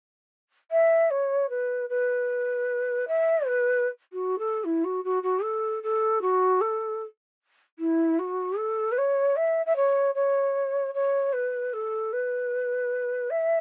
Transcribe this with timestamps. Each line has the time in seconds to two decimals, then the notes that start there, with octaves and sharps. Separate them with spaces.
0.71 E5
1.10 C#5
1.49 B4
1.89 B4
3.07 E5
3.47 B4
4.12 F#4
4.38 A4
4.64 E4
4.84 F#4
5.04 F#4
5.23 F#4
5.43 A4
5.83 A4
6.21 F#4
6.61 A4
7.78 E4
8.19 F#4
8.58 A4
8.91 B4
8.98 C#5
9.36 E5
9.66 E5
9.76 C#5
10.14 C#5
10.94 C#5
11.32 B4
11.73 A4
12.12 B4
13.30 E5